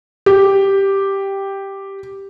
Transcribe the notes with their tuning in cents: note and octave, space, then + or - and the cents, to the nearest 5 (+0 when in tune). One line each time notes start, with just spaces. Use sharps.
G4 +0